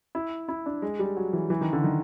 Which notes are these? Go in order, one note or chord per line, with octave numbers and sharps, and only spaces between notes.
E4
E4
D4
G#3
G3
F#3
E3
E3
D#3
D3
D#3